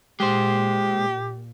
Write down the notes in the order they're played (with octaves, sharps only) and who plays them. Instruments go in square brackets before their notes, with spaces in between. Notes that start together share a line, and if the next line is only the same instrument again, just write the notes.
[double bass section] A#2 [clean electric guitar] G#3 C5 [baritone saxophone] G4